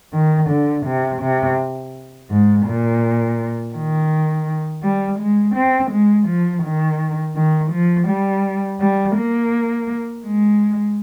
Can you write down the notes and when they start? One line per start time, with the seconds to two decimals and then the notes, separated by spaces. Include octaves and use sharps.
0.13 D#3
0.50 D3
0.86 C3
1.22 C3
2.30 G#2
2.66 A#2
3.75 D#3
4.83 G3
5.20 G#3
5.55 C4
5.91 G#3
6.28 F3
6.64 D#3
7.36 D#3
7.72 F3
8.08 G3
8.80 G3
9.16 A#3
10.25 G#3